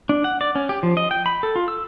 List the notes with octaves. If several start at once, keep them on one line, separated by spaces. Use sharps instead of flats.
D4
F#5
D5
C#4
G4
F3
D#5
G5
B5
A4
F4
E6